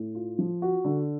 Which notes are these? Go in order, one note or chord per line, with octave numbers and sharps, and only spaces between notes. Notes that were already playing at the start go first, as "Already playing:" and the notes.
Already playing: A2
F4
F3
F#4
D3